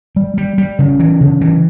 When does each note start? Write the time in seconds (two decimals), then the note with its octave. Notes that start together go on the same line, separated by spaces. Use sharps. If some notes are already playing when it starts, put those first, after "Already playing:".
0.16 G3
0.38 G3
0.58 G3
0.79 C#3
0.99 E3
1.21 C#3
1.41 E3